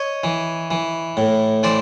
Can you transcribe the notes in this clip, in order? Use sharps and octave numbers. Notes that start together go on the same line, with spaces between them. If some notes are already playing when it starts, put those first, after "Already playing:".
Already playing: C#5 D#5
E3
E3
A2
E3 C5 D5